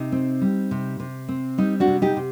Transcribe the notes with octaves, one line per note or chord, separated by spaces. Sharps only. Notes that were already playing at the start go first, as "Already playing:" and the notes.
Already playing: C3 D#4
C4
G3
C3
C3
C4
G3 D#4
D4 F#4
C3
D#4 G4
C3